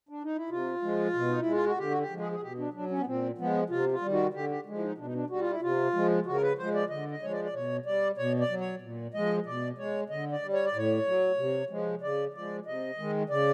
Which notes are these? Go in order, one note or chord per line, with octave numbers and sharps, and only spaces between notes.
D4
D#4
E4
C3 F4
F3 G#3
B2
D#4
E4
G#3
F4
F#4
D3 G4
F#4
G4
F3 G#3
G#4
G#4
B2 G4
D4
F#3 D4
C#4
B3
A#2 C4
F3 G#3 B3
C3 F4
F4
D#3 G3
F#4
D3 G4
G4
F3 G#3
E4
D#4
B2 D4
D#4
D4
G3 F#4
F4
E4
C3 F4
F3 G#3
C#3 F#4
A#4
B4
F3 G#3 C5
D5
D3 D#5
D#5
F3 G#3 C#5
D5
D5
B2 C#5
G3 D5
B2 C#5
D5
F#3
C#5
A#2
F3 G#3 D#5
B2 D5
G#3 C#5
D3 D#5
D5
G3
C#5
D5
A2 C#5
F#3
C3
F3 G#3
C#3 D5
F3 G#3 D5
C3 D#5
D#3 G#3
C#3 D5